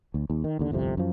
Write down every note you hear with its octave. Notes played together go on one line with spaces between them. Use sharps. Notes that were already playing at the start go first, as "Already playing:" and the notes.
D2
D#2
D#3
D#2 D3
G1 C2 F2 C3
F#2 F3